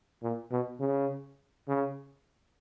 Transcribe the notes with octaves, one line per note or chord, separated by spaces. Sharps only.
A#2
B2
C#3
C#3